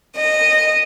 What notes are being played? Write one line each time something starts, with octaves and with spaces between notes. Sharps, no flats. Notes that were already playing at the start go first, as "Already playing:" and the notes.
D#5